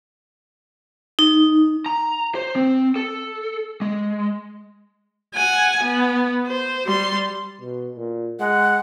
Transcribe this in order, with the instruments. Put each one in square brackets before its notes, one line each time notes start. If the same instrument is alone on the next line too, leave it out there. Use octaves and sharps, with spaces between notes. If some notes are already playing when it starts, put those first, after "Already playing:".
[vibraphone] D#4
[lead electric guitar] A#5
C5
C4
A4
G#3
[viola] F#5 G#5
B3
C5
G3 C6
[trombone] B2
A#2
[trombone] G#3 [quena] F#5